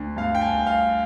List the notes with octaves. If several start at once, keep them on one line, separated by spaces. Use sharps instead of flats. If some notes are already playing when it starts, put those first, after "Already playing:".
Already playing: D2
G2 F5
G5
G#5
G1
F5